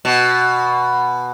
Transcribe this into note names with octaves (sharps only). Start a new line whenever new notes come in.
B2